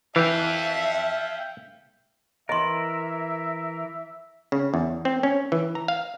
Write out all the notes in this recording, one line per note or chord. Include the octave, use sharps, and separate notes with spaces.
E3 E5 F5 G5
E3 A#4 D#5 E5 C6
C#3
E2
C4
C#4
E3
A#5
F5